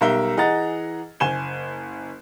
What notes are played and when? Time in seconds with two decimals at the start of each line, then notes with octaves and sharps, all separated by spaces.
0.01 B1 G3 A#4 E5 G7
0.37 E3 G#4 D#5 F#5 A#5 A6
1.20 F#1 G#5 E7 G7